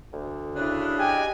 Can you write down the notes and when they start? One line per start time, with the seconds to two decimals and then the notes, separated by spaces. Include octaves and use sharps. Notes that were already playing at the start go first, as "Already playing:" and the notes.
0.13 D2
0.56 C#3 D4 E4 F#6
0.99 G4 D#5 G5 G#5